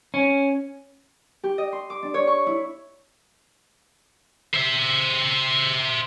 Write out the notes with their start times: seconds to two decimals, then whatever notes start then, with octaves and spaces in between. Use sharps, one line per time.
0.14 C#4
1.43 G4
1.58 D#5
1.72 C6
1.90 D6
2.03 D4
2.14 C#5
2.27 C#6
2.46 E4
4.54 C5 E5